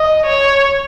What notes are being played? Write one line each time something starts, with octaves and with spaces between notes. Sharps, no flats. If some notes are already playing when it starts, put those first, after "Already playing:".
Already playing: D#5
C#5